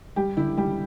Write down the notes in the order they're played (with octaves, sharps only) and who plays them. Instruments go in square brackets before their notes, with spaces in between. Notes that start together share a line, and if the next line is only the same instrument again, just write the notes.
[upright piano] G3 G4
D3 E4
G3 G4